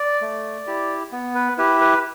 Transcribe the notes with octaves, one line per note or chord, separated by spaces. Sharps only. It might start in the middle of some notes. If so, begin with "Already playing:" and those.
Already playing: D5
A3
E4 G4
B3
B4
E4 G4 B4
B4